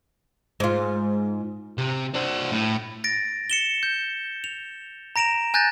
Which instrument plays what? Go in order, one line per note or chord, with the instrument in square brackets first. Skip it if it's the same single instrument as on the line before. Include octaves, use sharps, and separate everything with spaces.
[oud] G#2 F4
[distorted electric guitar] C3
D4 C5
A2
[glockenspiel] A6 A#6 D7
C#7 E7 G7
G6
F7
A#5 A#6 D7 E7 F7
G#5 F#6 G6 A6 A#6